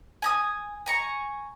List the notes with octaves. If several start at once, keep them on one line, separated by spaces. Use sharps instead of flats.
G#5 A#5 D#6
G#5 A#5 C#6